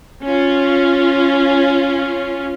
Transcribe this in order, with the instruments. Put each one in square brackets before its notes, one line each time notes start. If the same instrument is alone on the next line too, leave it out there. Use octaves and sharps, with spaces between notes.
[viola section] C#4 F4